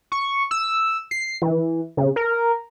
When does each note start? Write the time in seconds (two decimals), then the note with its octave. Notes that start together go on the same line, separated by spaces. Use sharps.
0.12 C#6
0.51 E6
1.11 C7
1.42 E3
1.97 C#3
2.16 A#4